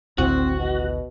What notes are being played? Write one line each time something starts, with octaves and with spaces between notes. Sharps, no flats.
G#1 D2 A2 C4 F#4
B2